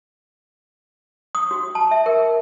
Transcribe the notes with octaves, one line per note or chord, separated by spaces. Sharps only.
D#6
F#4
A5
E5
A#4